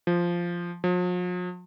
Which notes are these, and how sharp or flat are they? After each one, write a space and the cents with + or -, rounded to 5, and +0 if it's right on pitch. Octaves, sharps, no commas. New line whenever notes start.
F3 -5
F3 +45